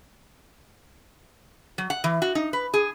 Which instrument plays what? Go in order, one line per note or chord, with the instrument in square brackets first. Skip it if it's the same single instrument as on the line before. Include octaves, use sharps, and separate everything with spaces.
[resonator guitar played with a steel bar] F#3
F#5
E3
F#4
D#4
B4
G#4